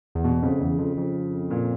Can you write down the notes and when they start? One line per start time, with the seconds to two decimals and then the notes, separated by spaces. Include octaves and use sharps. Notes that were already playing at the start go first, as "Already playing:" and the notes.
0.15 E2
0.24 B2
0.42 F2 C#3
0.60 E2
0.78 F2
0.97 F2
1.51 A#2